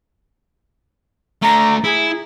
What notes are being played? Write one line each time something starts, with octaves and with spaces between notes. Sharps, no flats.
A3 D4 A#5
E4 G#4